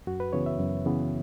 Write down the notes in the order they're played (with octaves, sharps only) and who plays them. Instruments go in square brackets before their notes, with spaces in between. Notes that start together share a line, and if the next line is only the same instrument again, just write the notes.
[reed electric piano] F#2 F#4
B4
C#3 E3 B3 C#5
E5
F#2
C#3 E3 B3